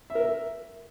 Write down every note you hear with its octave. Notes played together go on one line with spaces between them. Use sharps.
E5
A#4
E5